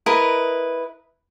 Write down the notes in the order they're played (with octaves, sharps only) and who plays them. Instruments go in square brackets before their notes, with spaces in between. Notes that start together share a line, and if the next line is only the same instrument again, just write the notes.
[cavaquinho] E4 A#4 B4 D#5